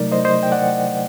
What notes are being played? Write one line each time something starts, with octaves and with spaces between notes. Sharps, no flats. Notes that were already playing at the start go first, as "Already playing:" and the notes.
Already playing: C3 F#3 A3 D#4 A#4 D5
C5 D#5
C5 D#5
G5
D5 F#5